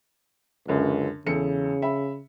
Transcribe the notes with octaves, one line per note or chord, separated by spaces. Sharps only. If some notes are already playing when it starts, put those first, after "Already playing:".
C#2 F#2 D3
E2 C#3 A4 C#7
E5 B5